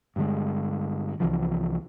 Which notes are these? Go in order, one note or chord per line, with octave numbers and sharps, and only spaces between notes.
G2 D3 G#3
C2 E3 F3